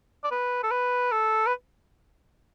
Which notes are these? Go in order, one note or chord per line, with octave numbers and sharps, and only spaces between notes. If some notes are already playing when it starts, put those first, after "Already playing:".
D5
B4
A4
B4
A4
B4